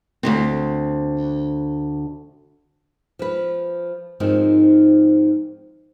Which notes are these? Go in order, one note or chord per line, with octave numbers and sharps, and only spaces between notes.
D2 G#2 C4
F3 B4
G#2 D#3 F3 C4 D#4